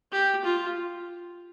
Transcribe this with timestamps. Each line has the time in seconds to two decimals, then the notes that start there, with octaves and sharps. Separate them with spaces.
0.12 G4
0.44 F4